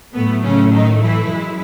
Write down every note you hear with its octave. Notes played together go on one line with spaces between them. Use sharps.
A2 F#3 A3 B3
C#3 C#4
D#3 D#4
E3 E4
F#2 E3 G#3